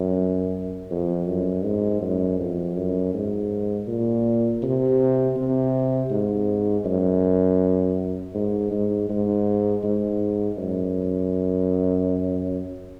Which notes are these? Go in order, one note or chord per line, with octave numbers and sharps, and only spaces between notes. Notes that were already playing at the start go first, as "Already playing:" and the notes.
Already playing: F#2
F2
F#2
G#2
F#2
F2
F#2
G#2
A#2
C3
C3
G#2
F#2
G#2
G#2
G#2
G#2
F#2